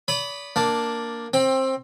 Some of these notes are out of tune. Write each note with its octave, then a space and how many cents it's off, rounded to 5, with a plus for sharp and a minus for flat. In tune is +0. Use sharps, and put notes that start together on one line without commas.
D5 -45 B5 +0 D#6 -30
A#3 +0 D4 +0 A5 +0
C4 +20 G5 +15